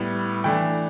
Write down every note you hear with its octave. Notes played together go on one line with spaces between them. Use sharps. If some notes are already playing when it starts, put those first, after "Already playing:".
Already playing: A2 G3 B3
E3 A3 D4 G5